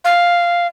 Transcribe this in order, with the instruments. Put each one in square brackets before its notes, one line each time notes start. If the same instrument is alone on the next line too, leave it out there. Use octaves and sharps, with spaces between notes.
[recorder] F5